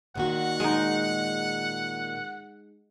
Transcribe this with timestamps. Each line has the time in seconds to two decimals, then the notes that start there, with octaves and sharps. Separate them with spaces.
0.15 A#2 D#3 F#4 F#5
0.60 G#3 D#4